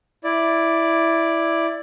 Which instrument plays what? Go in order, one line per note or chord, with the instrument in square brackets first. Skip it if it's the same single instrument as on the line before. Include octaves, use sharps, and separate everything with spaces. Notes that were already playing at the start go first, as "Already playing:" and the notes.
[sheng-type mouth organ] E4 D5